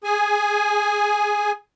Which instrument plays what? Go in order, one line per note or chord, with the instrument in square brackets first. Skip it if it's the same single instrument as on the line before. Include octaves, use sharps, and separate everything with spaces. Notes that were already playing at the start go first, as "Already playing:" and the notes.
[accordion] G#4 G#5